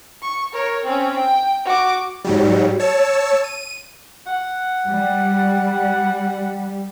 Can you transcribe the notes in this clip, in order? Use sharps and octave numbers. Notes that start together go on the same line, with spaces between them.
C#6
A#4 C#5
C4 C#4
G5
F#4 D6
G#2 F#3 G3
C#5 A5 E6
D#7
F#5
G3